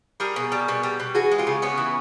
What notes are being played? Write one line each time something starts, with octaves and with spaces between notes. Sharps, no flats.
G3 G#4 A#4
B2
G3
B2
G3
B2
E3 F#4 G#4
G#3
F4 G4
C#3
C#3 B3 C#4
E3